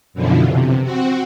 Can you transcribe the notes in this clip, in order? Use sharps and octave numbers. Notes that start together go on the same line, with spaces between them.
F#2 B2 D3 E3 F3
C3
C4 F#4